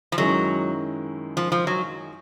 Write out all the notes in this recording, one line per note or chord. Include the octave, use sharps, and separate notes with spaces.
F3
F#2 D#3 F#3 G#3 C#4 E4
F3
F3
F#3